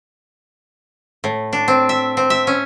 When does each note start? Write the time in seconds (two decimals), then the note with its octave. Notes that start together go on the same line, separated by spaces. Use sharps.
1.24 A2
1.53 D4
1.68 C4
1.89 E5
2.17 C4
2.30 E5
2.47 C#4